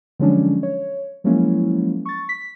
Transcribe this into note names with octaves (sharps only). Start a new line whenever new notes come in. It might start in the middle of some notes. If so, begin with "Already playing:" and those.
D3 F3 F#3 G#3 C#4 D4
C#5
F3 F#3 G#3 A#3 C#4 E4
C#6 A6
B6